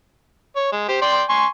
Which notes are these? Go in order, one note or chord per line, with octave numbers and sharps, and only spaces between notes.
C#5
G#3
G4 C5
D5 G5 C6
G#5 C6 C#6